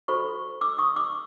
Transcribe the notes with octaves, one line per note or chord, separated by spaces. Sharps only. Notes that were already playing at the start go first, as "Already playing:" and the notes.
F#4 A4 C5 B5 C#6
D6 E6
C#6 D#6
D6 E6